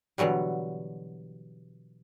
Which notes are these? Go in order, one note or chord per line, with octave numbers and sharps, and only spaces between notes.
B2 D3 E3 F#3 G3